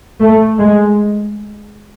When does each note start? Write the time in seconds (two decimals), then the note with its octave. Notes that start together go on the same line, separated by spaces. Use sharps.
0.22 A3
0.60 G#3